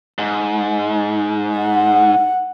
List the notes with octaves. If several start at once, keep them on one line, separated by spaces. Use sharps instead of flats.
G#2
F#5